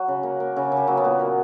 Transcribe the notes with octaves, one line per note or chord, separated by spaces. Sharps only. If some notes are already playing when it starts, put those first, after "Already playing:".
Already playing: F#3 F#4
C#3
A#3
A#3
C#3
C#3
G4
F#3 A#3 F#4
B3
A#2 A#3
A#3 B3